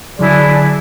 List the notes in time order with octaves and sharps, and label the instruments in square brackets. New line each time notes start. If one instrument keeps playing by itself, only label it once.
[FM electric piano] D3 F#3 [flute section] D4 E4 G#4 [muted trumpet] D5